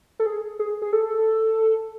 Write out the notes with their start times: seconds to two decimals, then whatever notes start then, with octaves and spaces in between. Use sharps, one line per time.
0.20 A4
0.26 G#4
0.59 G#4
0.82 G#4
0.93 A4